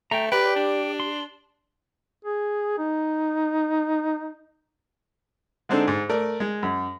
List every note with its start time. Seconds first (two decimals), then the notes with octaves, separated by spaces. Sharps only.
0.11 A3 G5 A#5
0.32 G4 B4 D5 G5
0.56 D4
1.00 C6
2.25 G#4
2.78 D#4
5.69 D3 G#3 C4 D4 D#4 A4
5.88 G#2
6.09 A3 A#4 D5
6.40 G#3
6.63 F#2